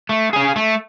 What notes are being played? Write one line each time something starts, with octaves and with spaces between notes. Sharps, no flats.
A3
C#4 G#4
A3